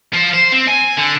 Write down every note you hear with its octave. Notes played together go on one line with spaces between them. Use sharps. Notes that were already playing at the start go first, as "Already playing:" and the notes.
F3 F4
C5
C4
G#5
D3